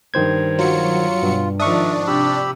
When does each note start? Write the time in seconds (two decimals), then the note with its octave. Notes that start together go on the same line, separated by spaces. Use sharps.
0.14 G2 D#3 C5 G#6
0.58 F#3 F4 C#7
1.23 G2 B2
1.60 G#2 D#3 F3 D4 E5 C#6 D#6
2.07 C3 G4 B5 E6